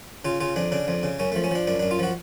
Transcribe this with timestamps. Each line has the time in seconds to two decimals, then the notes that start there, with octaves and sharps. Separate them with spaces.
0.25 C#3 F4
0.40 C#3 F4
0.56 F2 D4
0.72 C#3 D4
0.88 F2
1.03 C#3
1.19 F#2 C#4
1.32 A3
1.35 F3
1.44 C#4
1.51 F3 D4
1.67 F#2 D4
1.79 F#2 D4
1.91 F4
1.99 F3 F#4